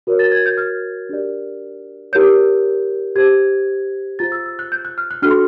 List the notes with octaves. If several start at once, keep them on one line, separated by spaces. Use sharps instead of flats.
F#4 A#4 C#5
A6
G#6
G6
F6
D4 G4 A#4 D5
E4 G4 A#4 C#5 G6
G4 C5 G#6
F4 G#4 C5 A6
E6
E6
F#6
G6
F#6
F6
F#6
D4 F#4 A4 F6
C6